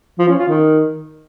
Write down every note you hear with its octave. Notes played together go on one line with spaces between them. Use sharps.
F3
C#4
F4
D#3